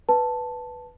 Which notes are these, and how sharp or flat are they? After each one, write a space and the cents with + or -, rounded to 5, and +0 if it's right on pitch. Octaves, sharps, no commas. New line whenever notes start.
B4 +0 A5 +0